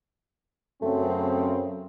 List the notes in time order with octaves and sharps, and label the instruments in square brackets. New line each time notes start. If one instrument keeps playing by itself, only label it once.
[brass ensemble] F#2 C#3 C4 [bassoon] A3